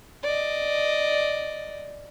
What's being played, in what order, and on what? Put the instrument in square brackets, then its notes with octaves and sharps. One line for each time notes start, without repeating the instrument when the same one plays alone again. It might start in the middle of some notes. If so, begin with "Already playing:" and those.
[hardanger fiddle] D5 D#5